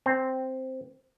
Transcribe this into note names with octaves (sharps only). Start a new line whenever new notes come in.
C4